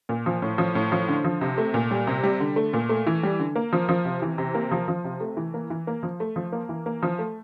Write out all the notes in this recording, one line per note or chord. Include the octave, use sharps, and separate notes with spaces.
A#2
F3
A2
F3
A2
F3
D3
F3
C3
A3
A#2
G3
C3
G3
D3
A3
A#2
A3
E3
G3
D3
A#3
F3
F3
C3
E3
C3
A#3
F3
F3
C3
A3
E3
A#3
E3
A#3
F3
A3
F3
A#3
E3
A#3
F3
A3